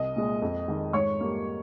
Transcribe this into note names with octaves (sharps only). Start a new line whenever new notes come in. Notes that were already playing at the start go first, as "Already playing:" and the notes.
Already playing: C2 D#5 D#6
A#2 G#3
F2
D#3 G#3
G#2 C#5 C#6
G3 A#3